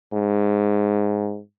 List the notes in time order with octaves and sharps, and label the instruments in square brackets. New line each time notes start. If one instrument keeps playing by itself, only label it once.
[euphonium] G#2